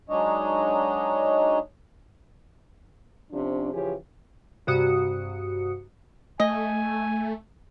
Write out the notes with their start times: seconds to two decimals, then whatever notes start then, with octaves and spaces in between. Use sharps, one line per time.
0.10 F#3 G#3 D4 D#4 C#5 D#5
3.31 C3 F3 C#4 D4
3.72 C#3 E3 F3 C#4 G4 G#4
4.67 G2 C3 F#4 D#6 C#7
6.40 A3 D#5 G#5